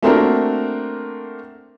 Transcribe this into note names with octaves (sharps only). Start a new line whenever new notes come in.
A3 A#3 C4 D4 F#4 A#4